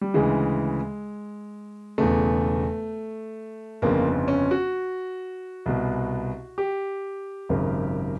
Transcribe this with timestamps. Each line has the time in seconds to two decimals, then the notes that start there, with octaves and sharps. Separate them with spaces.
0.01 G3
0.14 D2 C#3 E3 G#3
1.98 E1 E2 C#3 A3
3.82 G1 F2 C#3 A#3
4.28 C#4
4.51 F#4
5.66 C2 B2
6.58 G4
7.49 G#1 F#2 C#3